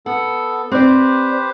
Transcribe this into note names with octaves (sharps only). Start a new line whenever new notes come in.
B3 A4 F#5
C4 G4 B4 C5 D5